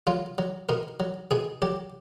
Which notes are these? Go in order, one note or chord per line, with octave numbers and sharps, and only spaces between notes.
F#3 F4
F#3
B2 A#4
F#3
B2 G#4
F#3 G4